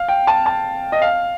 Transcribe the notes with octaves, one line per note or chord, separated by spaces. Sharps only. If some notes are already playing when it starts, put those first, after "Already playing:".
Already playing: F5
G5
A5
A5
D#5
F5